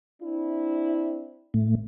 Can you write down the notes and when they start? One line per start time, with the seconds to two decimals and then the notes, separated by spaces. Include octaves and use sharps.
0.22 C4 D4 E4
1.54 A2 A3